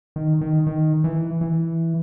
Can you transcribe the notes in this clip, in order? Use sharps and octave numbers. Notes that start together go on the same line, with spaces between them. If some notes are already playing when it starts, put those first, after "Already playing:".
D#3
D#3
D#3
E3
E3